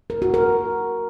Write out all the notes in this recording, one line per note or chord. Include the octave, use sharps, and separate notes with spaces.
A#4
F#4
A#4